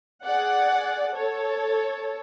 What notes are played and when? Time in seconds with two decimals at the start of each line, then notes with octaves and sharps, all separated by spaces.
0.24 G#4 D5 F#5
1.12 A4 C#5